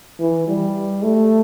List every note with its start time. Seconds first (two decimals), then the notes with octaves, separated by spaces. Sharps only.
0.20 E3
0.48 G3
1.03 A3